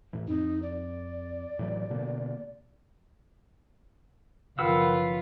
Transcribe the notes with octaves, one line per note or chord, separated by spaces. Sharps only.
A2 E3
F2 C4 D#4
D5
A2 E3 F#3
B2 D3 A#3
F#1 D#3 F3 F4 B4 F#5 E6